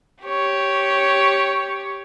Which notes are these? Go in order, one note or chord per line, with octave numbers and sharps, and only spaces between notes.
G4 C#5